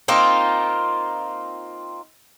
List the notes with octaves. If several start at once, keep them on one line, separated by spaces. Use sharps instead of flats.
A#3 C4 D#4 F4